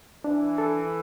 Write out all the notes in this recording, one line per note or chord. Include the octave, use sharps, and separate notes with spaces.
E3 D4
A4